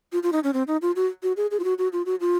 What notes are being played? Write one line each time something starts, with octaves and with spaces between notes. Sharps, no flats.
F4
F4
D#4
C#4
C4
D#4
F4
F#4
F#4
G#4
G#4
F4
F#4
F#4
F4
F#4
F4